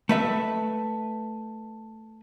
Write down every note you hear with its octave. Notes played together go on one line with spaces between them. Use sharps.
A3 B4 E5